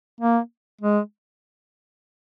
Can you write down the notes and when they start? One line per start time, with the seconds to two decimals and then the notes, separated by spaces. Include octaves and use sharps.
0.20 A#3
0.81 G#3